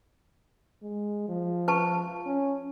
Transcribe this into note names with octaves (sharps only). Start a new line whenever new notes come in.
G#3
F3
B4 A5 C#6
C#4